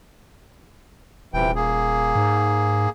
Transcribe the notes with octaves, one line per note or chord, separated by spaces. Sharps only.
D#1 C3 E3 G5
A#3 G#4
G#2